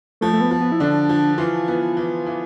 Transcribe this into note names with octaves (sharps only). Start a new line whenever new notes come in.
F3 A3
A3
B3
F3
B3
E4
D3 D4
F3
E3 F4
B3
E3
E3